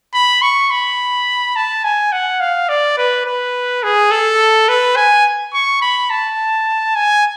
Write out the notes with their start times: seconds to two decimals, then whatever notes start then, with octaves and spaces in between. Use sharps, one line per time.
0.14 B5
0.42 C#6
0.71 B5
1.56 A5
1.84 G#5
2.12 F#5
2.40 F5
2.69 D5
2.97 B4
3.26 B4
3.83 G#4
4.11 A4
4.69 B4
4.96 G#5
5.54 C#6
5.82 B5
6.10 A5
6.95 G#5